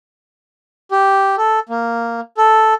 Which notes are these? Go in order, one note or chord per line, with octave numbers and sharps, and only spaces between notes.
G4
A4
A#3
A4